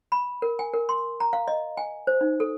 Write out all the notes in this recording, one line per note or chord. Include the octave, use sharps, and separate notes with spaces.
B5
A#4
G#5
A#4
C6
A#5
F5
D#5
G#5
C5
D#4
A4